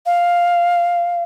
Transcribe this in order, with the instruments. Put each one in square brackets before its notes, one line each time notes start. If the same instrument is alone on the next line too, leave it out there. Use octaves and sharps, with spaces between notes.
[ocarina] F5